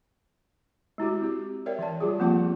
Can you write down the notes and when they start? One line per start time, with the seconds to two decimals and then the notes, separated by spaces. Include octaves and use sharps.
0.98 G#3 E4 F#4 G4
1.21 C4 G4
1.66 A#4 C#5 D5 E5 G5
1.79 E3 D5 A5
2.00 G3 F4 G4 G#4
2.19 F3 A#3 C4 F4 A5 D6